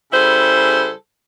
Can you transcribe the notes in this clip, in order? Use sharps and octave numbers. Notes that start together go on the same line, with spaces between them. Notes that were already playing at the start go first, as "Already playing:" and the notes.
C#3 G3 E4 G#4 A4 C5